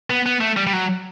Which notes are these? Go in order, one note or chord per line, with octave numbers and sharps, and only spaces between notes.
B3
B3
A3
G3
G3
F#3